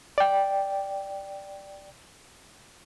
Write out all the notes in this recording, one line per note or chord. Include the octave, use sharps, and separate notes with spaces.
D5 G5